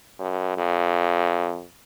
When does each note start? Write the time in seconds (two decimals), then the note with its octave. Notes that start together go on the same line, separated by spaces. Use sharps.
0.19 F#2
0.57 F2